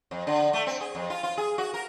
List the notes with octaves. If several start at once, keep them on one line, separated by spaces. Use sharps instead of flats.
F2
D3
A3
C4
G#4
F2
F4
F4
G#4
F#4
A#4